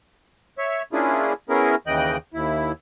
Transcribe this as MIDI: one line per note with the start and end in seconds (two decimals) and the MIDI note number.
0.58 0.82 73
0.58 0.82 76
0.93 1.33 58
0.93 1.33 61
0.93 1.33 62
0.93 1.33 64
0.93 1.33 65
0.93 1.33 68
1.49 1.75 59
1.49 1.75 61
1.49 1.75 64
1.49 1.75 68
1.49 1.75 70
1.87 2.17 39
1.87 2.17 49
1.87 2.17 52
1.87 2.17 75
1.87 2.17 79
1.87 2.17 90
2.34 2.72 39
2.34 2.72 64